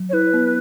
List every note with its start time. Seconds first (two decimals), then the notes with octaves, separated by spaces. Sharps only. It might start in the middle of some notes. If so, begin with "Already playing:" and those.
Already playing: F#3
0.09 C#5
0.13 E4 B4
0.34 B3